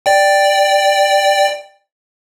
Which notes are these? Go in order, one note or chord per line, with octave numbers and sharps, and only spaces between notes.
D5 G5